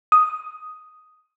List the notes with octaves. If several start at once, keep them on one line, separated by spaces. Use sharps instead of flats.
D#6